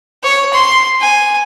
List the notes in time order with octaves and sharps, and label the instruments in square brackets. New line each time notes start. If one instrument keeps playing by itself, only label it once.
[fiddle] C#5
C6
G#5